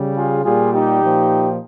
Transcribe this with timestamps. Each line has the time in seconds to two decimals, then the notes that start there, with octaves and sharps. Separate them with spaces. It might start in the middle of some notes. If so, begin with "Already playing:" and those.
Already playing: C#3 G3
0.16 F4 G#4
0.43 A#2 G3 F4 G#4
0.72 D#4 G4
1.01 A#2 F3